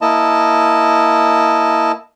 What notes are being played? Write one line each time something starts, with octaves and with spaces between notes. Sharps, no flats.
A#3 E4 D#5 A5